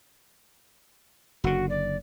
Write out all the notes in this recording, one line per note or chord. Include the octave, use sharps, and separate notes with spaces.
F#1 D3 F#4
D5